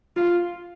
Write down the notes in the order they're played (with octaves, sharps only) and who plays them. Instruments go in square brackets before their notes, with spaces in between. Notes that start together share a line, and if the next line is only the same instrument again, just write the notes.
[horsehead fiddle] F4